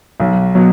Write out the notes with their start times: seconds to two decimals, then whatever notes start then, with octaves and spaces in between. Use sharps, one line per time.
0.20 B1
0.55 B2 F#3